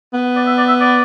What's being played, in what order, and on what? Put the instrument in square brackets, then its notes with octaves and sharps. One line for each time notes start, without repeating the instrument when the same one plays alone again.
[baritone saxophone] B3
[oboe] D5
E5
D5
E5
D5